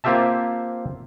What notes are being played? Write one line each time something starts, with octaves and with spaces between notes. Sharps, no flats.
A#3 C4 F4 G4 E5 A5